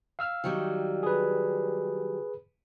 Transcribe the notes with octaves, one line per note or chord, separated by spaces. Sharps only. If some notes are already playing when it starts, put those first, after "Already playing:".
F5 E6 F6
D#3 F#3 G3
G#4 B4